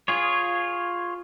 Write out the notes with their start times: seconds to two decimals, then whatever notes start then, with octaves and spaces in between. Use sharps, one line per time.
0.08 F4 G#4 C#5